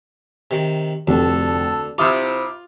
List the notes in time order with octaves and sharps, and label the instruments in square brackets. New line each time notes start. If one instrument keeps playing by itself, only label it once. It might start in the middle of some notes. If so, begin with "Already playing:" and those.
[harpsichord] C3 D#3
[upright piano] F1 [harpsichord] D2 [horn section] D4 A4
[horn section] C3 E4 [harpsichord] F4 [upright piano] D6 D#6 F6